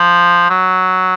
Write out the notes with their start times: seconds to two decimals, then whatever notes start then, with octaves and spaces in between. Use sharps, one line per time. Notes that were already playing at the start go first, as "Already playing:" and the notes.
Already playing: F3
0.50 F#3